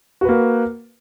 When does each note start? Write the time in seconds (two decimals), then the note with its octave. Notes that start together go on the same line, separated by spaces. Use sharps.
0.21 F#4
0.25 B4
0.29 A#3